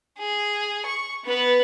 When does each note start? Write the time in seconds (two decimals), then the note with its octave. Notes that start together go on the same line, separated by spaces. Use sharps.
0.19 G#4
0.85 C#6
1.25 B3 B4